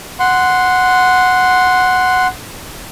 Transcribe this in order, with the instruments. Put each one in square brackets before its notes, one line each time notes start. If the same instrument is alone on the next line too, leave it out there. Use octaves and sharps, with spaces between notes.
[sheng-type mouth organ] F#5 C6